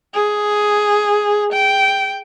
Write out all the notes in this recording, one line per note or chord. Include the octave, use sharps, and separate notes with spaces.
G#4
G5